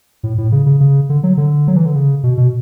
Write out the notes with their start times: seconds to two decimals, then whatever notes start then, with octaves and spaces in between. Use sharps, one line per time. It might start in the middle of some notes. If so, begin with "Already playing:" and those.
0.23 A2
0.38 A2
0.52 C#3
0.66 C#3
0.80 C#3
1.09 D3
1.23 F#3
1.37 D3
1.68 F#3
1.76 E3
1.86 D3
1.95 C#3
2.24 B2
2.38 B2